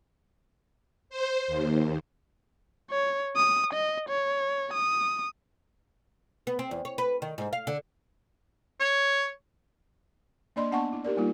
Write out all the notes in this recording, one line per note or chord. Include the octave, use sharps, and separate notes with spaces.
C5
D#2
C#5
D#6
D#5
C#5
D#6
B3
C4
E2
C#5
B4
D#3
G#2
F5
D3
C#5
A#3 D4 D5 D#5 B5 C6
B3 D4 F#5 G#5 A5 C#6
E4
D#4 G4 A#4 D5
G3 A#3 D#4 F4